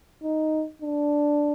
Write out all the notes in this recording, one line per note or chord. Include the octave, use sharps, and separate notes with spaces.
D#4
D4